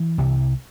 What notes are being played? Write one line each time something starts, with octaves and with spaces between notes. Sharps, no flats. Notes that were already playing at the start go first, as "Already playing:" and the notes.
Already playing: E3
C2 C3